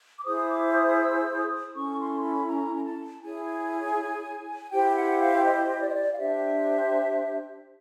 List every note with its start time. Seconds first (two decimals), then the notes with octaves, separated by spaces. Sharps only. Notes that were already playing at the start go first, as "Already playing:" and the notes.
0.18 D6
0.25 E4 G#4 C5 D#6
0.50 D6
0.74 D#6
1.00 E6
1.36 D#6
1.74 C#4 E4 A4 C#6
1.98 C6
2.23 B5
2.48 A#5
2.74 A#5
2.85 A5
3.22 E4 G#4 C#5 G#5
4.61 G#5
4.71 E4 G4 C5 G5
4.90 G5
4.95 F#5
5.20 F5
5.44 D#5
5.81 D5
5.89 D#5
5.96 D5
6.13 F5
6.18 D4 G4 C5 E5